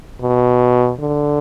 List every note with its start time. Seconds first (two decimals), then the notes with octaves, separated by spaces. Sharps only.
0.21 B2
1.00 D3